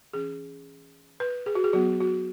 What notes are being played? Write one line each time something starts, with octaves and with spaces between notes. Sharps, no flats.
E3 C#4 G#4
B4
G#4
F#4
G#4
F#3 B3 F#4
F#4